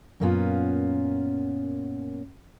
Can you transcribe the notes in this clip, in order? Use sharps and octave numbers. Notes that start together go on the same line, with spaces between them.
F#2 A#2 A#3 B3 C#4 F4